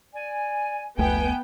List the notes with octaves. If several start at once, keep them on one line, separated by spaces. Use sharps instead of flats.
D5 G#5
F1 C#2 F3 A3 B3 E5 G5 G#5